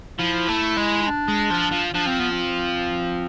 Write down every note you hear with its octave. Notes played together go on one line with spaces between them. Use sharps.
F3 E4
A3
G#3
E4
D4
G#3
F3
F3
F3 D4
C4
B3
C4